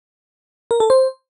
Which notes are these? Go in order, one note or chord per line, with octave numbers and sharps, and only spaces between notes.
A#4
A4
C5